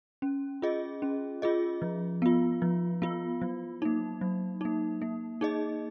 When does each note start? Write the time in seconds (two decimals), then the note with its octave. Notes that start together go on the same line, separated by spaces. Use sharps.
0.22 C#4
0.62 F4 G#4 D#5
1.02 C#4
1.42 F4 G#4 D#5
1.82 F3
2.22 B3 F4
2.62 F3
3.02 B3 F4
3.42 F#3
3.82 A#3 D#4
4.21 F#3
4.61 A#3 D#4
5.02 A#3
5.41 D#4 G#4 D#5